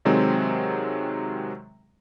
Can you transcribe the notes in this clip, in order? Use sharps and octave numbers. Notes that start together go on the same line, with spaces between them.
C3 D#3 F#3 G#3 C4